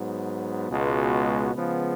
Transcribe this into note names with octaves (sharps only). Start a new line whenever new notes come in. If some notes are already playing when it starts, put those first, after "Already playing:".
Already playing: G#2 F#3 B3
C#2 B2 G#3 B3 F#4
C#3 F3 G#3 B3